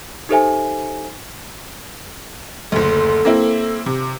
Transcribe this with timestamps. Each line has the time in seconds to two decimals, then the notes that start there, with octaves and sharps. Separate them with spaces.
0.29 D#4 G4 A4 C5 E5 G#5
2.72 F#1 D2 A4
3.25 A#3 C4 E4
3.86 C3